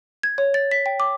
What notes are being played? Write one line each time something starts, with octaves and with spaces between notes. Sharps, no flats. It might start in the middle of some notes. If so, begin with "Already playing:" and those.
G#6
C#5
A6
B6
G5
D6